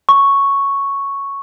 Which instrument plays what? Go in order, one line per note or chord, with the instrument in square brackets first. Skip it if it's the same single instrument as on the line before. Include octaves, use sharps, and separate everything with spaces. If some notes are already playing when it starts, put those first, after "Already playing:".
[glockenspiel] C#6